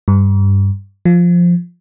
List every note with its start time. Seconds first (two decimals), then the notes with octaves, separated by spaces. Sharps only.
0.08 G2
1.05 F3